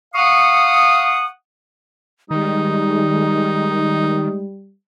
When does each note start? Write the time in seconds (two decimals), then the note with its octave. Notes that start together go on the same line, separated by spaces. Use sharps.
0.15 F5 F#5 C#6 D#6
2.31 D#3 G3 G#3 D#4